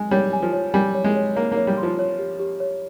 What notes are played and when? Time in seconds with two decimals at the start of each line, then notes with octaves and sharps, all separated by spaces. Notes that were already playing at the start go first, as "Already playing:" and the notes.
Already playing: G#3 G#5
0.11 G3 C#5
0.33 G#5
0.42 F3
0.53 C#5
0.74 G3 G#5
0.95 C#5
1.04 G#3
1.16 C#5
1.36 A#3 C#5
1.52 A#3
1.57 C#5
1.67 G3
1.77 C6
1.83 F3
1.99 C#5
2.19 G4
2.39 G4
2.60 C#5